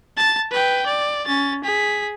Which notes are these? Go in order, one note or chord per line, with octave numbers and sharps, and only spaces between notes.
A5 A6
B4 G5
D5
C#4 A6
G#4 B6